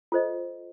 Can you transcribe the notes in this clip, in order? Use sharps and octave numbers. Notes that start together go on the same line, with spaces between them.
F4 A4 C5 D#5